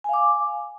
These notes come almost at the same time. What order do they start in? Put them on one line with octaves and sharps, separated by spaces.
G#5 F5 D6